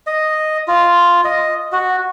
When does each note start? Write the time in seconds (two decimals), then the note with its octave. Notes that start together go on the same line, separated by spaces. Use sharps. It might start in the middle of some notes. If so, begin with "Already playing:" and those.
0.07 D#5
0.68 F4
1.25 D#5
1.72 F#4